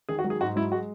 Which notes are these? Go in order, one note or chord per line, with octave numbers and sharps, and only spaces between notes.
D#3 G#4
F#4
F#3
G#4
G#2 F#4
F#3 E4
G#3 F#4